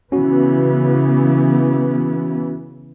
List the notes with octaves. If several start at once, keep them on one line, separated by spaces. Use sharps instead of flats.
C#3 E3 B3 C#4 F#4